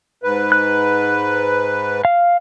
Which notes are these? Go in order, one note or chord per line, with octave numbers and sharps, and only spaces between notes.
G#2 B4
F#6
F5